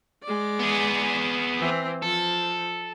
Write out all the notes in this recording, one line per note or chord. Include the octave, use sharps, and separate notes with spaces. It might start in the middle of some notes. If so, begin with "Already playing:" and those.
G#3 D5
B3 G#4
E3 C4
F3 A4